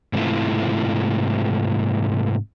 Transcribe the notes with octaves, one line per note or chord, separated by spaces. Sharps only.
G#2 C3 E3 A3 E4 F4